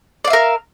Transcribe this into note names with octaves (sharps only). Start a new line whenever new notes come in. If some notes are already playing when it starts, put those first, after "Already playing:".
A#4 D5 E5 F5